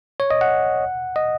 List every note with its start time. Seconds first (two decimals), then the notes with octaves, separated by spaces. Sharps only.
0.20 C#5
0.31 D#5
0.41 F#5
1.16 D#5